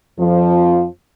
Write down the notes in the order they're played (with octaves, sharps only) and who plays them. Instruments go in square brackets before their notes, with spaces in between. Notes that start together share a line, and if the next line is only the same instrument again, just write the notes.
[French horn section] F2 F3